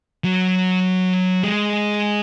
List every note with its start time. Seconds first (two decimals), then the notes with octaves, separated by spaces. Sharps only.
0.24 F#3
1.44 G#3